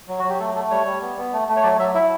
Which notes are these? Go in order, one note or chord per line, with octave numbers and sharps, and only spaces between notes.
F#3
F#3 F#4
G4
A3 A4
A3 A4
G3 C#5
G3
B3
B3
A3
A3
C#5
F#3 D5
F#3 E5
E4 E5